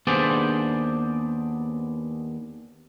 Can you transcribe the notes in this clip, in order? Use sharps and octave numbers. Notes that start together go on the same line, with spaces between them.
D#2 B3 D4 G#4 C5 D5